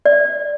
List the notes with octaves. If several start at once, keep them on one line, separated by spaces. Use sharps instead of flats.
D5